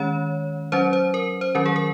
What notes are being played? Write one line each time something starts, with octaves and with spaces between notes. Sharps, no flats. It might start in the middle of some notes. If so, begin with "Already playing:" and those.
Already playing: D#3 G#3 C#4 C#5
F#3 C#4 C5
C5
A#4
C5
D#3 F#3 C#4 A#4
G#4
A#4